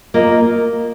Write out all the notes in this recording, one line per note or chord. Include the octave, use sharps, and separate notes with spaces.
A#3 F4 D#5